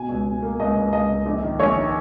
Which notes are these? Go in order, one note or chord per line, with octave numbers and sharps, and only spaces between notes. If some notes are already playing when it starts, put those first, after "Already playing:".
Already playing: B2 G#5
C#2
B2
A#3
C#2 D#5
C#2
C#2 D#5
C#2
A#1
D#3
A#1 C#5
D#3